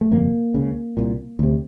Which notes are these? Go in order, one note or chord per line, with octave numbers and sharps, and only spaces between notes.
A3
G1 F2 C3 A#3
C#2 C#3
C2 A#2
D2 C3